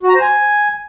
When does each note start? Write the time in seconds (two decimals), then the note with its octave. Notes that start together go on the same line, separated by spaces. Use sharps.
0.03 F#4
0.09 A#5
0.15 C5
0.21 G#5